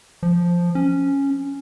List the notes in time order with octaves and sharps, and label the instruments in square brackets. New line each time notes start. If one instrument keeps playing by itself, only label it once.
[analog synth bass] F3
C#4